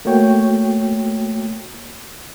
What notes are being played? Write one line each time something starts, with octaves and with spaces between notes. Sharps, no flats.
A3 A#3 F#4 C#5 G5